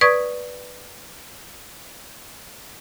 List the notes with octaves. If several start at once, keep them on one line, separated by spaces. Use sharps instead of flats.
B4 D5 C#6 D#6 G#6